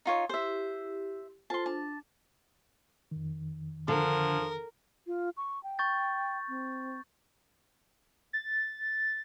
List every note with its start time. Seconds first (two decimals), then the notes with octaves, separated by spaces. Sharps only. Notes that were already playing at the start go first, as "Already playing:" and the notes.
0.05 D#4 F4 C#5
0.29 E4 G4 C5 E5
1.50 F4 A4 C5 A5 C6
1.66 D4 A5
3.11 F2 D#3
3.88 D3 F3 A#4
5.07 F4
5.37 C#6
5.63 G5
5.79 C#6 G6 A6
6.48 C4
8.33 A6